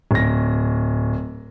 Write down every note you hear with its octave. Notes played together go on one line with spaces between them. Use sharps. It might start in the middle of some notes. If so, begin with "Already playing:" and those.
D1 A#6